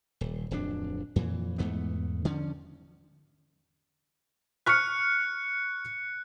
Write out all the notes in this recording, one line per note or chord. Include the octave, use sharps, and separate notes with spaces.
D#1
D1 F2 E3 D4
F2 A#2 E3
E2 G#2 A3 B3
D3 F3 C#4
C#6 F6 F#6 B6 C#7